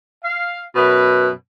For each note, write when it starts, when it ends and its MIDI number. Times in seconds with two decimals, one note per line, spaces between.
0.24 0.61 77
0.76 1.30 42
0.76 1.30 47
0.76 1.30 71